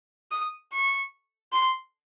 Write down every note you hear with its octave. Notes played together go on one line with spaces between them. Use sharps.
D#6
C#6
C6